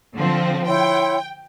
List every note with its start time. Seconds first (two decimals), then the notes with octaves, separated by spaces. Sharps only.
0.15 D3 F3 C4
0.66 E4 C#5 G5 C6